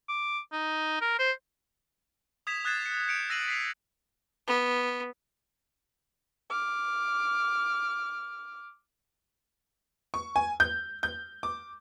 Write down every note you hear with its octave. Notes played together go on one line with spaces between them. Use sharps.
D6
D#4
A#4
C5
D#6 G#6 B6 E7 F7
D#6 F#6 G#6 A6 C7 E7
A6 C#7
G6 C#7 D7 F7
E6 A#6 C7 D#7 E7 F#7
B6 C7 F7
B3
D6 F6
C#6
G#5
G6
G6
D6